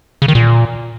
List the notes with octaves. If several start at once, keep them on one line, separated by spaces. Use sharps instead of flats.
C#3
D#3
A#2